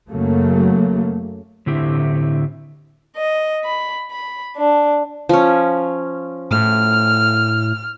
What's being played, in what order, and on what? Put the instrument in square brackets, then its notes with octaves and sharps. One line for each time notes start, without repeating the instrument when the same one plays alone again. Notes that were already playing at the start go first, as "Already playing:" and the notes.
[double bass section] F#2 C#3 F#3 A3 A#3
[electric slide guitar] A2 D3 A3 C4 E4 G4
[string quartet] D#5
B5
B5
D4
[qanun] F3 C#4
[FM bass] A2 [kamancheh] F6